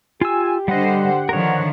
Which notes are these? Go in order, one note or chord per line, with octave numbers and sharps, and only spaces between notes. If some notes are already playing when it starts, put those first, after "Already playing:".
F4 G4 G#5 E6
D3 G3 C5 D#5 F#5
D3 D#3 F3 A#4 C#5